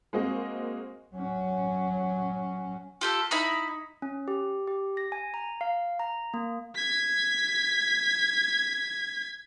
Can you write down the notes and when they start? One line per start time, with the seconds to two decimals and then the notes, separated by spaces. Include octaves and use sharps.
0.13 G#3 A#3 C4 F#4 D#5
1.15 F#3 C#4
3.01 F4 G4 A4
3.31 D#4 E4 B5
4.02 C#4
4.28 G4
4.67 G4
4.97 A#6
5.12 G#5
5.34 A#5
5.61 F5
5.99 A#5
6.34 A#3
6.75 G#6 B6